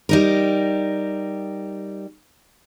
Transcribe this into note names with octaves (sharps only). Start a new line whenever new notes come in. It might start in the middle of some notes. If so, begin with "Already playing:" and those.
G3 D#4 A#4